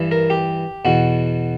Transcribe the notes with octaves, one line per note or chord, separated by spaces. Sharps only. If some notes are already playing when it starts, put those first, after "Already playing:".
Already playing: G2 E3
A#4
G4
E2 B2 F#4